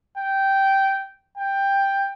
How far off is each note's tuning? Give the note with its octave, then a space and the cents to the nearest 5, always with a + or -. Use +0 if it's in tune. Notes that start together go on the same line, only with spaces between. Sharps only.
G5 -10
G5 +10